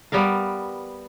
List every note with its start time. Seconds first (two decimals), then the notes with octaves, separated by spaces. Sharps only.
0.12 G3 B3 A#4 F5